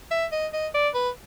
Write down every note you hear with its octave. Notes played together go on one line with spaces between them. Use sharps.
E5
D#5
D#5
D5
B4